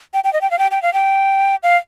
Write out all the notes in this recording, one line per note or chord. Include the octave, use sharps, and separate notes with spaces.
G5
G5
D#5
G5
F5
G5
G5
F5
G5
F5